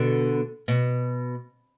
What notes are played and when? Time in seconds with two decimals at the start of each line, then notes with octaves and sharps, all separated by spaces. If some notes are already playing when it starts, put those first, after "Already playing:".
Already playing: B2 D3
0.68 B2